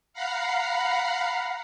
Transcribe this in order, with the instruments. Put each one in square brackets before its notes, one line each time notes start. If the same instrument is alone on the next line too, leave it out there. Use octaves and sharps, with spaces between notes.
[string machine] F5 F#5 A#5 B5 C7